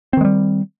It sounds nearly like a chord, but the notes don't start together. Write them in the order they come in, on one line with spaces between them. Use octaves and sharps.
C4 D#3 G#3 G3